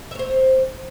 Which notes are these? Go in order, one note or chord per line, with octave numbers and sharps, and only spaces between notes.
C5 C#5 E5